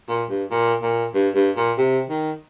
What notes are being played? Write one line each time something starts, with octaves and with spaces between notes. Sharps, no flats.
A#2
G2
A#2
A#2
G2
G2
A#2
C3
D#3